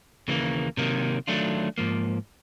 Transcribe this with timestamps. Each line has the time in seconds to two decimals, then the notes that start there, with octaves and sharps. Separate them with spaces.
0.28 D#2 C#3 E3 G3 A#3
0.77 C3 D#3 F#3 A#3
1.27 D#3 F#3 A3 D4 F4
1.78 G#2 F3 A#3